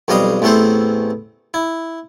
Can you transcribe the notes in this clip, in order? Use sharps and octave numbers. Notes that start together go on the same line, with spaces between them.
B1 F2 G3 D#5 F5 D#6
A1 E2 A3 C4 A4 C5
E4